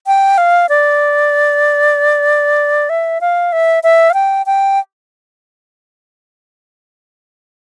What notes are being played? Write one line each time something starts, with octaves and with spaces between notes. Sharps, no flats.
G5
F5
D5
E5
F5
E5
E5
F5
G5
G5